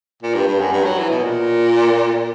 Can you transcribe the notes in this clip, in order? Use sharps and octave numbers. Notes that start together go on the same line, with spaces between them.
A#2
G2
G2
F#2
G2
F#3
E3
B2
A#2